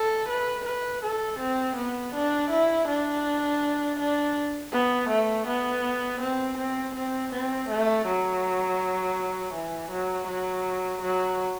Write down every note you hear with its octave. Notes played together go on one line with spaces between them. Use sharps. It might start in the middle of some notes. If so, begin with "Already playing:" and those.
Already playing: A4
B4
B4
A4
C4
B3
D4
E4
D4
D4
B3
A3
B3
C4
C4
C4
C4
A3
F#3
E3
F#3
F#3
F#3